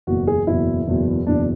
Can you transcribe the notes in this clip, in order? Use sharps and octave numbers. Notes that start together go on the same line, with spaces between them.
F#1 E2 B2 F#4
G#4
F#1 E2 B2 E4
F#1 E2 B2
F#1 E2 B2 D4